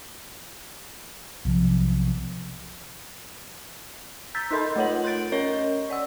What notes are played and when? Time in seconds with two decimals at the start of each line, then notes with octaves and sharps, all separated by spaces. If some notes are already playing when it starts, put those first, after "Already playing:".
1.45 B1 C3 F3
4.35 A#5 E6 G6 A6 B6
4.51 D#4 A4 A#4 D#5 B5 C6
4.76 A3 F4 C#5 F#5 F#7
5.04 C6 F#6 G6 A6 D7
5.32 C#4 A#4 C#5 D#5 C#6 G7
5.90 D5 F#5 E6